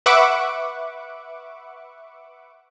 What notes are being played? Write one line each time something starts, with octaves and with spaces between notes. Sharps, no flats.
B4 E5 F#5 C#6 D6